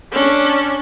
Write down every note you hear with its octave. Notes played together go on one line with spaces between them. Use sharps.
C#4 D4